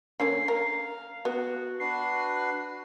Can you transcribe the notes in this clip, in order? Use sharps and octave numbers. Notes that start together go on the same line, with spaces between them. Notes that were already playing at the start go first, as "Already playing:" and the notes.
D3 A#3 C#4 C7
A#4 F5
B3 F#4
D4 F#4 B4 C7